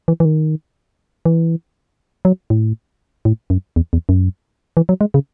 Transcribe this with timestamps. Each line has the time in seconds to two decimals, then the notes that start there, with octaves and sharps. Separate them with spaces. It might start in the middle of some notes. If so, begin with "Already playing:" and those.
0.08 E3
0.20 E3
0.25 D#3
1.25 E3
2.25 F#3
2.50 A2
3.25 A2
3.50 F#2
3.76 E2
3.93 E2
4.09 F#2
4.77 E3
4.89 F#3
5.01 G#3
5.14 C#3